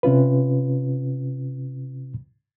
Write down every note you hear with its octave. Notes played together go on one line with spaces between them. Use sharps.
C3 C#4 F4 B4